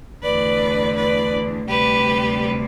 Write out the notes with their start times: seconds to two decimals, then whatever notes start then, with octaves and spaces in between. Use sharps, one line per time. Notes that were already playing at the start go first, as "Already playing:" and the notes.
0.23 E2 D3 A3 B4 D5
0.96 B4 D5
1.68 D2 C3 G3 G4 B4